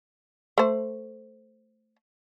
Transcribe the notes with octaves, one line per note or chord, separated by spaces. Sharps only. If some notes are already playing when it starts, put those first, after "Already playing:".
A3 C5